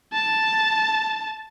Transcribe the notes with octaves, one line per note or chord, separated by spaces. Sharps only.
A5